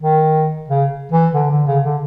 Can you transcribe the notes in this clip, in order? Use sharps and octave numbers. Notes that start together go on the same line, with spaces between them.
D#3
C#3
E3
D3
D3
C#3
D3